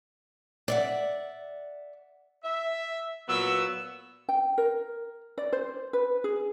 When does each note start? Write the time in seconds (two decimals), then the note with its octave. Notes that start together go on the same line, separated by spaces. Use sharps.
0.68 D5 E5 F#5
2.44 E5
3.28 A#2 F#3 B3 E6
4.29 G5
4.58 A#4
5.38 D5
5.53 C5
5.93 B4
6.24 G#4